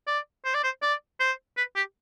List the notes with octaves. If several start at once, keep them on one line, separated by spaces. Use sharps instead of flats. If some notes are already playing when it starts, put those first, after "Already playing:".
D5
C5
D5
C5
D5
C5
B4
G4